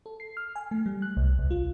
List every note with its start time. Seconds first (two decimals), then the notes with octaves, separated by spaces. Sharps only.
0.06 A4
0.20 C7
0.37 F6
0.56 G#5
0.71 A3
0.86 G3
1.02 F#6
1.17 C2
1.39 C2
1.51 F4